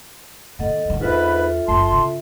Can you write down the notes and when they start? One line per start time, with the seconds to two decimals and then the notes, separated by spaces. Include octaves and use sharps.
0.59 D#3 A#3 A4 D#5 F#5
0.85 G2 D#3
1.01 E2 G#2 D4 F4 A4 B4 E5
1.68 F#1 F#2 A5 C6
1.92 C#3